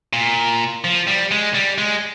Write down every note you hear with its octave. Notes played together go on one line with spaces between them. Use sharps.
A#2
F3
G3
G#3
G3
G#3